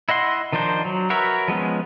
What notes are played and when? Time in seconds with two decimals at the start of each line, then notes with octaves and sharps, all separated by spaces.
0.09 E4 D#5 F#5 C6
0.53 D#3 F3 D4 D#4 C5
0.85 F#3
1.10 F#4 A#4 B4 C#5 E5
1.48 F3 G#3 B3 C#4